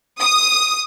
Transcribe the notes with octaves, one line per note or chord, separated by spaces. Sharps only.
D#6